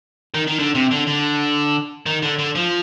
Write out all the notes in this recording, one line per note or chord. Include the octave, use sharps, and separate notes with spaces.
D#3
D#3
D3
C3
D3
D3
D#3
D3
D3
F3